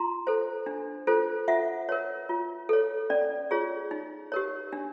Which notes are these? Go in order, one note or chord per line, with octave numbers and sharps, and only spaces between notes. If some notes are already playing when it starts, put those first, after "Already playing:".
Already playing: F4 A#5 C6
A4 C5
D4
F4 A4 C5
F4 E5 F#5
A#4 C#5
F4
A4 C#5
C#4 D5
F4 G#4 C#5
D#4
G4 A#4 C#5
D4